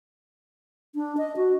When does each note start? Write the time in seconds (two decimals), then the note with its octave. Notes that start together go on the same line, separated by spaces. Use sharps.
0.95 D4
1.18 D#5
1.37 F#4